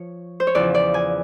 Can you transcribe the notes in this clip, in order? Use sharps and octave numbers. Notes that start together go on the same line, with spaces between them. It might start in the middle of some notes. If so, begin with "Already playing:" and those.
Already playing: F3 C#5
C5
C#5
E2 C#3 F3 D5
D5
G#5